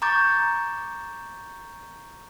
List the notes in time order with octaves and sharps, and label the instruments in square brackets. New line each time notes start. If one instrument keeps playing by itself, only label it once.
[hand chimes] A#5 C#6 D6 G6 A6